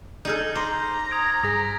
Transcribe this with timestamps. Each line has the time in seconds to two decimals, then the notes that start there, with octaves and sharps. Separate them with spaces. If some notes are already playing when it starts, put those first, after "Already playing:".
0.25 D#4 G#4 A4 F6 G6
0.55 C5 A#5 C6 D6
1.11 D#6 G#6 D7
1.43 G2 G#4 D#6 A#6 B6